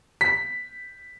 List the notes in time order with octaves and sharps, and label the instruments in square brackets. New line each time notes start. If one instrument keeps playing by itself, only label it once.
[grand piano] B6